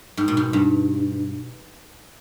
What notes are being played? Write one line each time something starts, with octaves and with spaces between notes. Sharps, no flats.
G#2
B2
G#2
G2